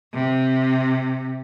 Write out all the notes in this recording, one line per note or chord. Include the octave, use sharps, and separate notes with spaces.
C3